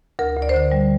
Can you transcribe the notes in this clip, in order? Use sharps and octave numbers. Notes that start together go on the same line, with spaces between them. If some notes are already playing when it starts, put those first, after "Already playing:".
D2 A#4
D2
D5
C5
D3 D5
G3